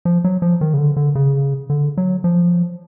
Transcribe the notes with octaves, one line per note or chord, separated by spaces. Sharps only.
F3
F#3
F3
D#3
C#3
D3
D3
C#3
D3
F#3
F3